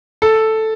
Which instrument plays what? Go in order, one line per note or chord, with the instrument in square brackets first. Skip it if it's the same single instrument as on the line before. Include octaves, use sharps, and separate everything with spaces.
[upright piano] A4